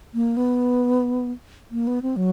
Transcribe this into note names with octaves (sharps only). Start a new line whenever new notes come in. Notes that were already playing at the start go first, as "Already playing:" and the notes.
A#3
B3
A#3
B3
C4
F#3